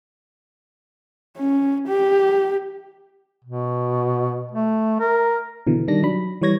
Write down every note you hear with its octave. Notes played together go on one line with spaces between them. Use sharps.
C#4
G4
B2
A3
A#4
B2 D3 E3
D#3 G3 D4 A#6
F#3 D4 B5
E3 G3 C#5 G#6 A#6